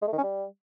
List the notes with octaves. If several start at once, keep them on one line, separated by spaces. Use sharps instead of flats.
G#3
A3
D#3
C#4
G3